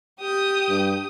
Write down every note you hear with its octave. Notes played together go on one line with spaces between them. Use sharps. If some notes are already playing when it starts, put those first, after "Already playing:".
G4 D#6
G2